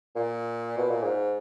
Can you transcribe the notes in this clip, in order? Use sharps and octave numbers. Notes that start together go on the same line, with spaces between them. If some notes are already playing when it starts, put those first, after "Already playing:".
A#2
B2
A#2
G#2